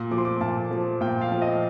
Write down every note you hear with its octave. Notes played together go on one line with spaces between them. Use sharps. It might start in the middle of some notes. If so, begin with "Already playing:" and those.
Already playing: A#2
F3 D6
C6
D6
A#2 A5
F3
A#2 G5
F5
F3
D#5